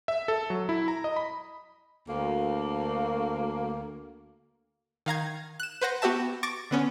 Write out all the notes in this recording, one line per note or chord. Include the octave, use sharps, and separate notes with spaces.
E5
A4
F#3
E4
A#5
D#5
B5
D2 A#3
D#3 F5 A#5 G#6
F#6 E7
B4 C5 F#5 A#6
B3 F#4 G4 E5 A5
C#6 D6 A6 A#6 D7
D3 B3 C#4